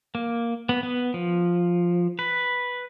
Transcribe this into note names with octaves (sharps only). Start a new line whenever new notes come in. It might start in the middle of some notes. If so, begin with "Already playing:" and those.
A#3
B3
B3
F3
B4